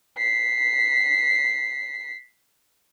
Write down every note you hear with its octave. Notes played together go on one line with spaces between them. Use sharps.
B6 C7